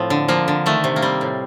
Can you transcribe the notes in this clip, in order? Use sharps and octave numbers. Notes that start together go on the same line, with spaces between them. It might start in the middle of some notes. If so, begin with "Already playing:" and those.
Already playing: A2 F3 C4
D3
F3 A#3
D3
D#3 A3
C3
A#3
G3 C4
A2